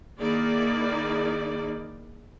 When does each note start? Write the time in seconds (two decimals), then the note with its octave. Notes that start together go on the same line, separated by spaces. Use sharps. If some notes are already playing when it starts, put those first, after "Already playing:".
0.20 D#3 A#3 D#4 E4 G#4 D5